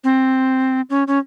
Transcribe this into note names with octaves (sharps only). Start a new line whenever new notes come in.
C4
C#4
C#4